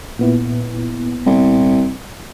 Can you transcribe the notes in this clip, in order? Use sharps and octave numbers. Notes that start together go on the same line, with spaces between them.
A#2 B3 E4
C2